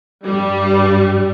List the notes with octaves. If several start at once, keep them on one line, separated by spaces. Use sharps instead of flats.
G2 G3